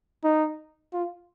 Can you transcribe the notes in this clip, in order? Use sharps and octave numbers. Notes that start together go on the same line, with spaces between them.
D#4
F4